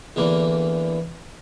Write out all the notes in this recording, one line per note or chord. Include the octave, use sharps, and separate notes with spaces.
E2 D3 E3 A#3